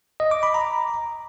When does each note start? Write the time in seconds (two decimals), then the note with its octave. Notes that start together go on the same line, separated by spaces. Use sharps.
0.20 D#5
0.31 D6
0.43 B5
0.54 A#5